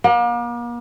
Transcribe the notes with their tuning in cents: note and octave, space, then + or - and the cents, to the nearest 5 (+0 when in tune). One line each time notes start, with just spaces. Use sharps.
A#3 +40